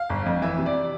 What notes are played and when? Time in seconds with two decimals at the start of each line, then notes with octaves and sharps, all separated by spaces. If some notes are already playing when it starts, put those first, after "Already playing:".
Already playing: F5
0.10 G1
0.26 F2
0.42 E3 E5
0.59 C3
0.66 D5